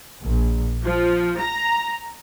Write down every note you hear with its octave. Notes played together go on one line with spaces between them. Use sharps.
A#1
F3
A#5